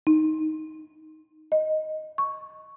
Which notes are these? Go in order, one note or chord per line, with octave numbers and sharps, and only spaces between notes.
D#4
D#5
C#6